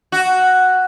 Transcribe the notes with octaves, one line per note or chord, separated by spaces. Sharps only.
F#4